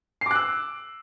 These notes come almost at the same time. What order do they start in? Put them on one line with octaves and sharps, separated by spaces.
C7 D6 F#6 E6